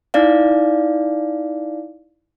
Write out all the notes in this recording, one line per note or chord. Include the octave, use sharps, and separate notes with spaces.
D#4 E4 D5 F5